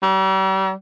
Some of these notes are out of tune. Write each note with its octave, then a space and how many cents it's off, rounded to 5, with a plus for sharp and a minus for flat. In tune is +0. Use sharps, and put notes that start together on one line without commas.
G3 -40